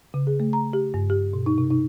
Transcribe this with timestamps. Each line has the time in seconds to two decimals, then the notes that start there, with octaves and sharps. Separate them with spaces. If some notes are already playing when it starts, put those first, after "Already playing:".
0.14 C#3
0.27 G#4
0.40 A3
0.53 A#5
0.73 G4
0.94 G2
1.10 G4
1.33 B2
1.46 D#4
1.58 C3
1.71 D#4